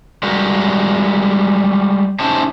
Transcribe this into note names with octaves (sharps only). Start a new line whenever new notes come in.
G3 G#3 F#4 G4 A#4
C#4 D#4 E4 G4 C5 A5